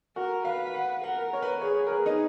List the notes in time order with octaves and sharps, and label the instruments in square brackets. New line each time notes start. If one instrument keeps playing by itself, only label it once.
[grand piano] F#4 [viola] A#4
[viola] B4 [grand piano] F5
[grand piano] F#5
[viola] A#4 [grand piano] F#5
[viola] A#4 [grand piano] C#5
[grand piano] B4
B4
[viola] G#4 [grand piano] C#5
[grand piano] A#4
[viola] G#4 [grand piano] B4
[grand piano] D#4